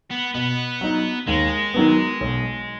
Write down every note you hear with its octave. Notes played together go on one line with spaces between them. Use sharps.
B3
B2 B3
F#3 D#4
D#2 G#3
D#3 F#3 B3
B1